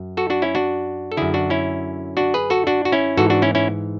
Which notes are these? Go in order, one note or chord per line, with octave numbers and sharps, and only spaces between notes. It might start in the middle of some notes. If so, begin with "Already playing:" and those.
Already playing: F#2
F#4 A4
D4 F#4
C#4 E4
D4 F#4
A4
F#2 D3 E4 G#4
D4 F#4
C#4 E4
D4 F#4
G#4 B4
F#4 A4
D4 F#4
F#4
C#4 E4
G#2 E3 F#4 A4
D4 F#4
C#4 E4
C#4 E4